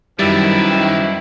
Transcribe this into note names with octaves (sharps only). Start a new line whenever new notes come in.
F#2 B2 D#3 F3 G3 E4 A6